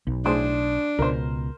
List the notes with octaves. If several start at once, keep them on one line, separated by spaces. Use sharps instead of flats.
B1
A2 D4 G#4 C5
C#2 B2 A#4 C5